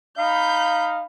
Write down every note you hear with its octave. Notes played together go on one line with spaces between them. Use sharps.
D#4 F5 B5 G6